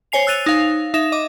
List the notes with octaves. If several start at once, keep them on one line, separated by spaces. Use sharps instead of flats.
C5 C#5 G#5 C7 F7
E6 F#6 A6 D#7 F7
D#4 F5
D#4 E5 E7
D#5 D6